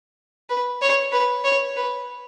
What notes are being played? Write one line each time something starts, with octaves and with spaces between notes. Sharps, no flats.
B4
C#5
B4
C#5
B4